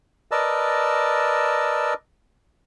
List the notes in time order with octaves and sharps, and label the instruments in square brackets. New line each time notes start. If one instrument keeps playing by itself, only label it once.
[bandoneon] A#4 B4 D5 D#5 A5 E6